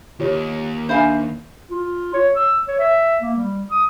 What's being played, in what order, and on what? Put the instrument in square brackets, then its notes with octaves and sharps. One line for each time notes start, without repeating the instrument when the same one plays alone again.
[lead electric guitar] D#2 [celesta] F4 G4 C#5
[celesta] D4 E5 B5 [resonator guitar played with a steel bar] C5 F5 G#5
[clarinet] F4
C#5
E6
C#5
E5
A#3
G3
D#6